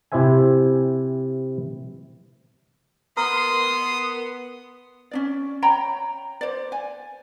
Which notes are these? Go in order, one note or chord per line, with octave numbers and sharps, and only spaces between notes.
C3 E4 G4 C5 E5 G#5
B3 A#4 C6 D#6
C#4 D4 D5
C#5 G5 A#5 B5
C5 D5
G#5